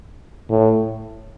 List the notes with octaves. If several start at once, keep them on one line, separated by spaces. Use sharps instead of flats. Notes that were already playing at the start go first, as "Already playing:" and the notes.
A2